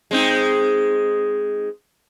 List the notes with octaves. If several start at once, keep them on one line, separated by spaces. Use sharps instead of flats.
G#3 C4 D#4